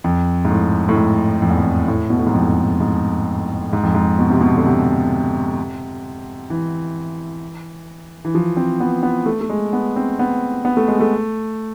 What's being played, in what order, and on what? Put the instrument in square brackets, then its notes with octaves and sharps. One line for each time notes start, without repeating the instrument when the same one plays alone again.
[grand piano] F2
G#2
A2
A2
G#2
F2
E2
F2
A2
B2
A2
G#2
F2
G#2
G#2
F2
G#2
B2
C3
B2
D3
C3
E3
E3
F3
C4
B3
B3
A3
A3
G#3
B3
C4
B3
B3
A3
G#3
A3